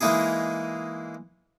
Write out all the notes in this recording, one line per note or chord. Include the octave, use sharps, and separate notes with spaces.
E3 G#3 A#3 D#4 E4 G#4